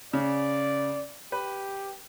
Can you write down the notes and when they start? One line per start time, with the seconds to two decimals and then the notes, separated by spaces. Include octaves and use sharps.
0.13 C#3 D5
1.32 G4 B4